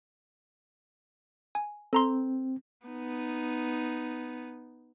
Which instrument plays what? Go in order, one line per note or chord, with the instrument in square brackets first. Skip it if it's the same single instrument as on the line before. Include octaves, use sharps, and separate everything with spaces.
[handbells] G#5
[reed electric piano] C4 [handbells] A4 A#5 C6
[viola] B3 D#4